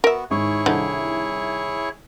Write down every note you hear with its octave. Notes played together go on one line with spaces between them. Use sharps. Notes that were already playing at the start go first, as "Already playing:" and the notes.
B3 F#4 A#4 E5
G#1 G#2 E4 G#4 C#5 C#6
C2 D3 D#3 F3 D#4